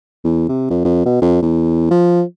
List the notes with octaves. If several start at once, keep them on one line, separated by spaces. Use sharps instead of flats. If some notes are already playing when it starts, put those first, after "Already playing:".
E2
C3
F2
F2
B2
F2
E2
F3